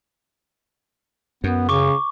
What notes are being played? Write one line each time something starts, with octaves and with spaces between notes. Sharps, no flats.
F#2 B3
C#3 C#6 D6